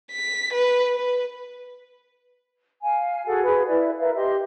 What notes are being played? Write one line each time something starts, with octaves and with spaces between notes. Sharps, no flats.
B6
B4
B4
F5 G#5
F#4 G#4 A4 F#5
G#4 B4 B5
E4 B4 D5 E5
A#4 B4 E5 F5
G4 D#5 E5 C6